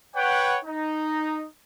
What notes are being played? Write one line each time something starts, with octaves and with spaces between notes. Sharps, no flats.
B4 C#5 F#5 G5
D#4